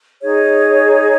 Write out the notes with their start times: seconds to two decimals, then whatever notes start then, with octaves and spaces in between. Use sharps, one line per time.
0.22 D#4 G#4 C#5